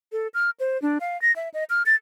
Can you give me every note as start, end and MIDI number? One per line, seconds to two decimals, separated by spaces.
0.12 0.28 69
0.34 0.50 89
0.60 0.80 72
0.82 0.98 62
1.00 1.20 77
1.22 1.34 94
1.36 1.49 76
1.54 1.64 75
1.70 1.83 89
1.86 1.95 93